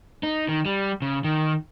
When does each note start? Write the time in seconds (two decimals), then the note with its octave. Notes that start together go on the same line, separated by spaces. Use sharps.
0.23 D#4
0.49 D#3
0.65 G3
1.02 C#3
1.24 D#3